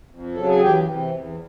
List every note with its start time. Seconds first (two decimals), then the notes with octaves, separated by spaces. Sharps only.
0.11 F2
0.34 C#3 F#3 A4
0.47 G#4
0.61 E2 G4
0.85 C3 E3
1.11 E2